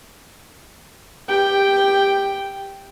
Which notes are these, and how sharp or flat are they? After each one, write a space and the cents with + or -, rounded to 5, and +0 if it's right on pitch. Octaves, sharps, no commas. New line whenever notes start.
G4 +15 G5 +0